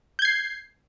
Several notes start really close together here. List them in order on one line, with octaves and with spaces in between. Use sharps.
G6 G#6 C7